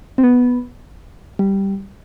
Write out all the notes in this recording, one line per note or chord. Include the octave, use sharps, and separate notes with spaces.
C4
B3
G3